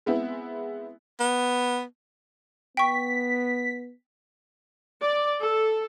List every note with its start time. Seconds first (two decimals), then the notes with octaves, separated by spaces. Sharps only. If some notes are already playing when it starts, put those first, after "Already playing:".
0.06 G#3 B3 C4 E4
1.20 B3
2.77 B3 G5 C#6 B6
5.02 D5
5.42 A4